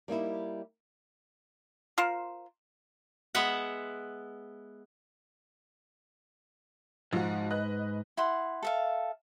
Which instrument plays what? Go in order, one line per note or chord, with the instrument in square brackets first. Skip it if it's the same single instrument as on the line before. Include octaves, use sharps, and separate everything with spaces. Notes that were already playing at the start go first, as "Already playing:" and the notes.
[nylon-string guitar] G3 A#3 D#4 E4
[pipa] F4 A#4 C5
[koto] G#3 B3 B4 E5 F#5
[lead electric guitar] G#2 [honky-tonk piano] F3 F#4
[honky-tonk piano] B4 D#5 F#6
[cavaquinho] E4 F#5 C6
A4 E5 F5